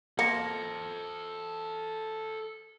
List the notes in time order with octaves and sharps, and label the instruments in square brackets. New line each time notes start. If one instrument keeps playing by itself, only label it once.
[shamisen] A#3 [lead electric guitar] A4 C5 [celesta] A#6 C#7